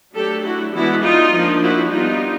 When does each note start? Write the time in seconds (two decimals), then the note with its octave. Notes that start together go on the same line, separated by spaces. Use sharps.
0.15 F#3 A3 D4 G4 A4
0.44 E4 F#4
0.73 E3 G#3 B3 D4 E4 F#4
1.03 D#4 F4
1.32 F3 A#3 D4
1.62 E4 F#4
1.90 G3 B3 D4 D#4 F4